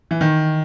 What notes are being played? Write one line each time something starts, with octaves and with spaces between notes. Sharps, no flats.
E3
D#3